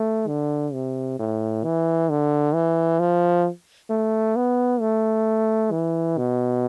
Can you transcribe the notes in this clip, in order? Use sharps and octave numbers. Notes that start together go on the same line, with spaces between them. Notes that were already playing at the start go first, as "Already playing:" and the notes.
Already playing: A3
D3
C3
A2
E3
D3
E3
F3
A3
B3
A3
E3
B2